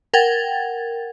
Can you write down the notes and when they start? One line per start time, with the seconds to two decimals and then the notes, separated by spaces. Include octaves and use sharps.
0.14 A#4 F#5 G5 G#6 A6